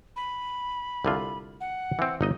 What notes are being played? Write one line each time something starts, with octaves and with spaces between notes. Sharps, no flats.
B5
C2 D3 F4
F#5
E3 C4
G1 D#4 D#5